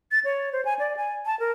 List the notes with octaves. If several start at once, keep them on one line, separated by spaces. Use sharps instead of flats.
A6
C#5
C5
G#5
D5
G#5
A5
A#4